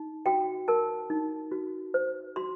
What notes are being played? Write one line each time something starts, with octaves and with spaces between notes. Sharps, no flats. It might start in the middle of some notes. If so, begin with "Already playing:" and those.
Already playing: D#4
F#4 G5
A#4 A5
D#4
F#4
C5
F#4 C6